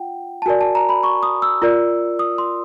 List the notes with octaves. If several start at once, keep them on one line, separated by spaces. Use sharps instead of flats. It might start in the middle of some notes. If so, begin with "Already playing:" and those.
Already playing: F4 F#5 G5
A5
F#4 A#4 D5 G#5
A5
A#5
B5
C#6
D#6
E6
F4 A#4 D5
D#6
C6